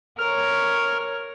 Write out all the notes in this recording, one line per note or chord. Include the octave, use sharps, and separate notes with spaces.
A#4 C#5 F6